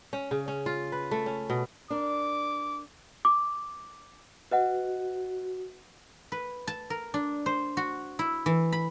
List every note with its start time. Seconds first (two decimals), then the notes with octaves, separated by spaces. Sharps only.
0.13 C#4
0.31 C#3
0.48 C#4
0.66 F4
0.92 B4
1.11 A3
1.26 C#4
1.50 B2
1.90 D4 A#4 D6
3.25 D6
4.51 F#4 B4 D#5 F#5
6.32 B4
6.67 A5
6.90 A#4
7.14 D4
7.46 C5
7.77 F#4
8.19 E4
8.46 E3
8.73 B5